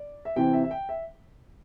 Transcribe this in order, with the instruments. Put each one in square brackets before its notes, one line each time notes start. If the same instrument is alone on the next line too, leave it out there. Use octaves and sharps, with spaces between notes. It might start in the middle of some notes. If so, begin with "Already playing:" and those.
Already playing: [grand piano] D5
E5
C3 E3 C4 G5
E5
E5
G5
E5